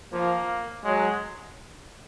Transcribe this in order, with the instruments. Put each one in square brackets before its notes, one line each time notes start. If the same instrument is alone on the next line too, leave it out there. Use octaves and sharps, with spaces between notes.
[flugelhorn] F3 [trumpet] A#3
[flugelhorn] F#3 [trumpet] G#3